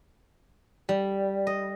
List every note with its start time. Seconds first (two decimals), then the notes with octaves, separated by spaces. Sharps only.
0.89 G3
1.47 D#5